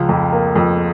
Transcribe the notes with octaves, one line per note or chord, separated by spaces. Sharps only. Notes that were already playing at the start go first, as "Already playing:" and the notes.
Already playing: C#2 F3
F2
A#3
F2